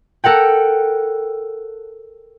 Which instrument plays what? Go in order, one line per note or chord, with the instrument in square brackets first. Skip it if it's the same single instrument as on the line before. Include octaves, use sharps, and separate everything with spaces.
[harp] A4 A#4 F#5 G5